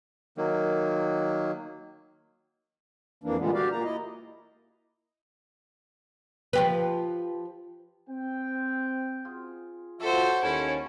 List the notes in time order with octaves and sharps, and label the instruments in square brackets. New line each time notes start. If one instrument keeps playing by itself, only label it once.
[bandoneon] D#3 F#3 A#3
[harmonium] F2 E3 A#3 D4
A#2 D3 E3 G3 G#3 B3
F#4 G4 D5 F5
A#2 A#3 A#5
E4 D#5
[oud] F3 G4 B4
[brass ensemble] C4 G5
[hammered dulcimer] F4 G#4
[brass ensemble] F3 E5 [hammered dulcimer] F#4 C#5 F#5 [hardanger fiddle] A4 C5
[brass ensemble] D#2 C#4 [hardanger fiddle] E4 A4